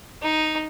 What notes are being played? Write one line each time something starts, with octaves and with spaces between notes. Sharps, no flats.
D#4